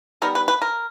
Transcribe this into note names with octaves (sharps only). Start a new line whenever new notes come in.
D#3 G3 B3 A#4
B4
B4
A#4